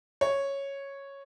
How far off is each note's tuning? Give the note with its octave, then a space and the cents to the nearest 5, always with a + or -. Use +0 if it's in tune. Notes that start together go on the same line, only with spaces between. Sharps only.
C#5 -5